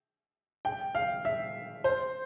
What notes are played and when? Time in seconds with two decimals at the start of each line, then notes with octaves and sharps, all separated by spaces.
0.65 G5
0.95 F5
1.25 E5
1.84 C5